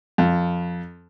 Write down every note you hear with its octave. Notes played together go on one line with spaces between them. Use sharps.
F2